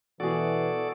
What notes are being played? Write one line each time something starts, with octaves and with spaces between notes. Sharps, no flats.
B2 E3 F#4 G#4 A4 D5